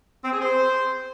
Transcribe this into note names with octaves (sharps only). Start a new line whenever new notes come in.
C4
G#4
C5